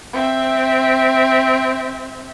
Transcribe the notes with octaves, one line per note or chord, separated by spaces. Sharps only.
C4 E5